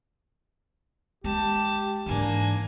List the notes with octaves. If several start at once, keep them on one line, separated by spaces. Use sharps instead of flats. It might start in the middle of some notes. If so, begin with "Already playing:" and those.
G#3 G4 A5
G#2 E3 A#3 D4 G#5